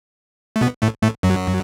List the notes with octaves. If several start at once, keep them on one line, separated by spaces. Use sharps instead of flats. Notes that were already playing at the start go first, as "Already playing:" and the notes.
A3
B2 B3
A2 A3
A2 A3
F#2 F#3